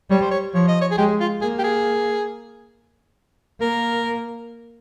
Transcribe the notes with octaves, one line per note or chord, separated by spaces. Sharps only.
G3 C#5
C5
C#5
F3 C#5
D#5
C#5
G#4
G#3 G4
F4
A#3 G#4
G4
G#4
A#3 A#4